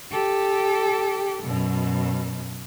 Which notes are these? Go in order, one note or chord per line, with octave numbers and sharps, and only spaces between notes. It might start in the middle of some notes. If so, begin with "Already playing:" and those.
G4 A4
F#2 B2